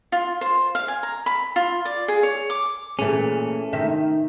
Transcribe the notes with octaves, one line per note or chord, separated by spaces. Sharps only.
F4
C5
F5
G#5
A#5
B5
F4
D5
G#4
C#5
D6
A#2 E3 A3 C#4 G#4
C3 D#3 E5